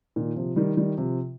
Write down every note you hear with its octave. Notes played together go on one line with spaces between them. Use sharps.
A#2 D#3
C3 F3
D#3 G3
D#3 G3
C3 F3